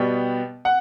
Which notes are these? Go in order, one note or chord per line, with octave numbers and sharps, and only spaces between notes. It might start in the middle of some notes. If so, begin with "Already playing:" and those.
Already playing: B2 G3 B3 G5
F#5